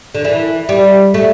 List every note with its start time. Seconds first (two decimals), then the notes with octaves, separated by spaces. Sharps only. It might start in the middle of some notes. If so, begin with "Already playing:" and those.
0.14 D3
0.24 E3
0.69 G3
1.14 A3